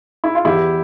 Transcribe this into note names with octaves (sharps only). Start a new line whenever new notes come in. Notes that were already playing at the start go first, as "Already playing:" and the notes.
E4
F4
E2 E4 G4